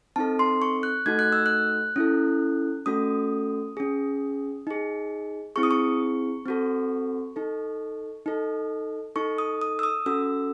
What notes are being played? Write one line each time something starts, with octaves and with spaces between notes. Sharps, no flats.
C4 D#4 A4 A5
C6
C#6
F#6
A3 D#4 F#4 A4 G#6
F#6
E6
F#6
C#4 E4 A4
A3 C#4 F#4 A4 D#6
C#4 G#4
D#4 G#4
C4 E4 G#4 C#6
D#6
C#6
C4 F#4 A4
D#4 A4
D#4 A4
D#4 A4 C#6
D#6
D#6
E6
D#6
C#4 F#4 A4 E6